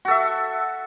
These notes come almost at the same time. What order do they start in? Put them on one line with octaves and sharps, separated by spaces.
F#4 A4 E5